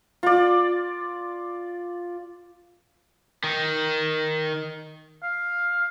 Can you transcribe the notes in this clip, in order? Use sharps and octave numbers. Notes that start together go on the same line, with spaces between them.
F4 D5
D#3
F5